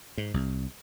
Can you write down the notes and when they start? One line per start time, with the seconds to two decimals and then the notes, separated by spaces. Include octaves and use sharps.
0.18 G#2
0.34 C2